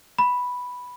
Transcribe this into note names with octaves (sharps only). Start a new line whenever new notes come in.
B5